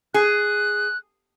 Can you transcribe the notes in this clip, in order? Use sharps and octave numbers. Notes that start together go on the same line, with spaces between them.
G#4 F#6